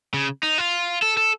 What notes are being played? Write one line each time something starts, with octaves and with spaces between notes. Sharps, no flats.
C#3
D#4
F4
A4
A4